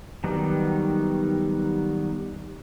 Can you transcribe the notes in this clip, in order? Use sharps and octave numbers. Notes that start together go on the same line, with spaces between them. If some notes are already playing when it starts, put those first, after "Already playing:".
D#3 F#3 G3 B3 D#4